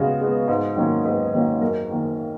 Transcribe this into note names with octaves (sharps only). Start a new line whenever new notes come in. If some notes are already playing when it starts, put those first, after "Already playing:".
Already playing: C#3 G#3 B3 F#4
G#3 B3
G#2
D#3 F#3 A#3 C#4
G#2 B4
D#3 F#3 A#3 C#4
F#2 A#4
D#3 A#3